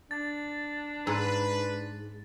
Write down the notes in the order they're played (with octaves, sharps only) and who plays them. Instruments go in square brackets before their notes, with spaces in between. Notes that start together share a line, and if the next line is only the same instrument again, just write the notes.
[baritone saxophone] D4 [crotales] A6
[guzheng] G#2 [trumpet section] B4